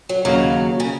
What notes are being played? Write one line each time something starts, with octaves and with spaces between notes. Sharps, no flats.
F#3
D#2 C#3 F#3 A#3
C#3